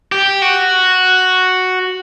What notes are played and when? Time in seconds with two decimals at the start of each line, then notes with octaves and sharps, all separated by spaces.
0.12 G4
0.42 F#4